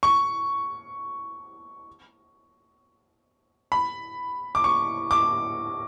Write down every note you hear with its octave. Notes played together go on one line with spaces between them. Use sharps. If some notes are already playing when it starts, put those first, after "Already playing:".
C#6
B5
D6
C#6
D6